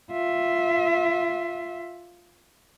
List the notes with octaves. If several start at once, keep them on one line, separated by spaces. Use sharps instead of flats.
F4 E5